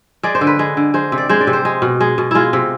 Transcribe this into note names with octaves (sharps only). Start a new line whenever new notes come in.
G#3 D5
C5
D3
B4
G#3
D3
G#3 C5
C3
D5
G#3 C5
D5
C3
C5
G#3
B2
G#3
B2
G#3 E4 F4
C3